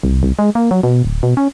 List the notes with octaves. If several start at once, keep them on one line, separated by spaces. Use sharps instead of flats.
C2
C2
G#3
A#3
F#3
B2
D1
B2
C#4